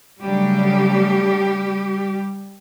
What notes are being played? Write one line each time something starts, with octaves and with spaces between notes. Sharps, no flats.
C#3 F#3 G3 A3 D4 G4